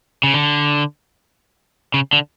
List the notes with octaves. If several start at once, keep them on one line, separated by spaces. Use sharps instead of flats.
C#3
D3
C#3
D3